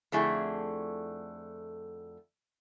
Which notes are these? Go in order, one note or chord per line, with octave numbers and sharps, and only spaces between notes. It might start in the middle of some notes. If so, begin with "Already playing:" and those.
F2 D3 A3 E4 G#4